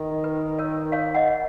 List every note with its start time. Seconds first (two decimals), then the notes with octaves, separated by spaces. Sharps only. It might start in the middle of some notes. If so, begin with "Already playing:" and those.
Already playing: D#3
0.24 B4
0.59 A#4 C#5
0.92 C#5 F5
1.15 D#5 F#5